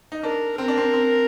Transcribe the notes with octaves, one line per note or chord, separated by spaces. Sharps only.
D#4
D4 A#4
C4 A#4
D4
C4
C4